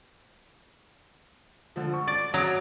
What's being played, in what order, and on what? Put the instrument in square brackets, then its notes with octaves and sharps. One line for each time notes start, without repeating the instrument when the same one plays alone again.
[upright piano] D3 F3
C#6
[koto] D5
[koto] F#3 [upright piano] C#5 D#6 D7